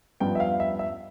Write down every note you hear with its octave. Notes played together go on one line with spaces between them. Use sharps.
G2 F3 B3 G5
E5
F5
E5
E5